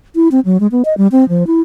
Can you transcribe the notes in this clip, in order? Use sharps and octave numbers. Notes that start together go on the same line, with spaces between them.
E4
C4
F#3
G#3
B3
D#5
G3
C4
F3
E4